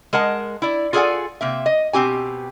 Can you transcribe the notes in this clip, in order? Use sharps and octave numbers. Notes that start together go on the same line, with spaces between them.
G#3 A#4 F#5 A5
E4 D5
F4 G#4 A4 D5 F#5 G#5
C3 A#3 E5
D#5
B2 C4 G4 G#5